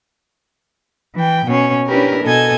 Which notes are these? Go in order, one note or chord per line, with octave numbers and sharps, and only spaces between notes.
E3 G5
B2 C#4
C#4 D4 E4 G4 A#4 B4
B2 A4 D#5 G#5 G#6